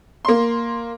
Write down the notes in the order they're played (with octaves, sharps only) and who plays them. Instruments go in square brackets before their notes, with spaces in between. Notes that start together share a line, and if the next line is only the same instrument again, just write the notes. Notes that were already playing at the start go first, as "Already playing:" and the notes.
[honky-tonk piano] A#3 C6